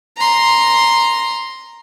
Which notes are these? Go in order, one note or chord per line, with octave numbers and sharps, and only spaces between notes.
A#5 C6